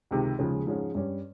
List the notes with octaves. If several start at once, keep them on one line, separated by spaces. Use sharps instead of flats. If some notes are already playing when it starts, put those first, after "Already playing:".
C#2 C3 D#3
D#2 C#3 F3 G#3
G#2 F3 G#3 C#4
G2 G3 C#4